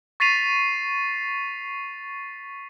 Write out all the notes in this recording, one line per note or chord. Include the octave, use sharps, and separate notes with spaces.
C#6 A6 B6 C7 D#7 F7